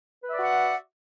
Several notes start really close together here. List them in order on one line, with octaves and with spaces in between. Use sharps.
B4 E5 D5 F#4 F#5